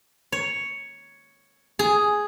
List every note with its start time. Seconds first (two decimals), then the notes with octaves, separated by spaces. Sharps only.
0.32 C#5
1.79 G#4